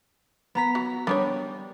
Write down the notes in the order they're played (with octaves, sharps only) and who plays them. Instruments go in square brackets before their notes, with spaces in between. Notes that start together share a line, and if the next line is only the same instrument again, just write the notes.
[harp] B3 A#5 B6
[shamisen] F#3
[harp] G3 [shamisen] B3 D4 C#5